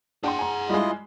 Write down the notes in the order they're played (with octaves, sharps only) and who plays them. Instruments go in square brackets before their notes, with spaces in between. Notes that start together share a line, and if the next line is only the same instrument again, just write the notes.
[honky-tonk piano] D4 G5 C6 [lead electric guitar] G#4 F#5
[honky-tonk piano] G#5 A#5
[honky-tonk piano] G3 G#3 [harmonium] E4 F4 D#5